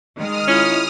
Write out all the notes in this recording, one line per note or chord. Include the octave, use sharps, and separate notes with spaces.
D#3 G#3 D#6 F6
C#4 E4 F4